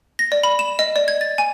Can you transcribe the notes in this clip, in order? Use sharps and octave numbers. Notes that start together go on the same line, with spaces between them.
A#6
D5
B5
E7
D#5
D5
G#6
A6
G#5